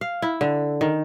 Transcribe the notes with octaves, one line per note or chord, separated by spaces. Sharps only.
F5
E4
D3
D#3